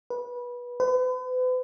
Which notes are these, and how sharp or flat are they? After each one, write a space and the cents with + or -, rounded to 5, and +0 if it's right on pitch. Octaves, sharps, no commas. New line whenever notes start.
B4 -20
B4 +40